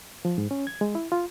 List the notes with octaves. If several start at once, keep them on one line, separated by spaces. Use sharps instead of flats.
F3
G#2
C#4
G#6
G#3
E4
F4